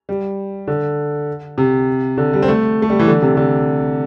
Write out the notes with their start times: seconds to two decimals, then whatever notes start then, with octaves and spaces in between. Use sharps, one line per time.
0.09 G3
0.67 D3
1.58 C3
2.17 D3
2.33 G3
2.42 C4
2.48 A3
2.82 A3
2.90 G3
2.99 E3
3.08 D3
3.22 C3
3.37 D3